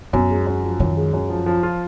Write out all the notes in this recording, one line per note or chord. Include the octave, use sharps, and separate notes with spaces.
F#2 B3
G#3
F#2
F3
F#2 D#3
G#3
F#2
F3
F3
F4